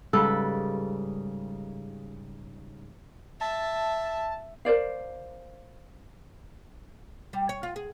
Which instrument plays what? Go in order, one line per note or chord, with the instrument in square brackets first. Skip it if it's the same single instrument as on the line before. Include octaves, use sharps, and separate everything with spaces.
[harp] G#2 C#3 G3 [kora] A4 B4
[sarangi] E5 [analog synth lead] A5
[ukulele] A#4 C5 D5 F5
[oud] G3
C#5
F4
G#4